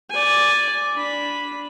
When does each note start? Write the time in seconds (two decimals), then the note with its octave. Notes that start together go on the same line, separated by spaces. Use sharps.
0.10 D5 G#5
0.94 D4 B5